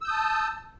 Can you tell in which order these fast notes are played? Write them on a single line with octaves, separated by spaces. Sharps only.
E6 G6 D#6 A5